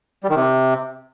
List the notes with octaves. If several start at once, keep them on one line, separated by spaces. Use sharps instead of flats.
G3
D#3
C3